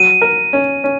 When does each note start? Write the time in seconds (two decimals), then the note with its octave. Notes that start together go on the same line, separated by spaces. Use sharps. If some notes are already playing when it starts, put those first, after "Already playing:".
Already playing: F#3 D#7
0.22 A#4
0.53 C#4
0.84 C#4